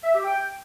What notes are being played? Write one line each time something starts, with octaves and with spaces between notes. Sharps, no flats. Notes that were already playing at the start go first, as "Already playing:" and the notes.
E5
G4
G5